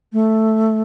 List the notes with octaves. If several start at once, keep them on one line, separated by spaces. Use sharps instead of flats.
A3